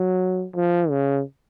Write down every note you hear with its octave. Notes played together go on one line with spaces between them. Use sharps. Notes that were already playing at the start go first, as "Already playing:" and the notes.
Already playing: F#3
F3
C#3